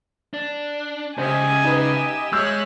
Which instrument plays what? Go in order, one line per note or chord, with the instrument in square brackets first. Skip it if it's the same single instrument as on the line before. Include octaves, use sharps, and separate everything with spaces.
[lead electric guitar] D4
[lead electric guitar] G#2 C#3 [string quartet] G4 D#5 E5 [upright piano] C5 [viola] G#5
[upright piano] D#4 B4
[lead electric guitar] G#3 [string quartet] C#5 E5 F#6 [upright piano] E6 G6